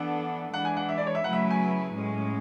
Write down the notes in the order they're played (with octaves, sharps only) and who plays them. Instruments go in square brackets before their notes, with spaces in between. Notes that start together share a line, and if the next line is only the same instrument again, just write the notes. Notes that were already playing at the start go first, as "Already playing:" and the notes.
Already playing: [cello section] E3 B3 D4 A4 [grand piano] F#5
[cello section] E3 G#3 D4 [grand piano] F#5
[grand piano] G#5
F#5
E5
D5
C#5
E5
[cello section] C#3 F#3 A3 E4 B4 [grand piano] F#5
[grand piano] E5
G#5
[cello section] A2 G#3 C#4